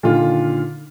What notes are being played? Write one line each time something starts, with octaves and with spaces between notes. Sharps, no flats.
A#2 D3 D#3 F4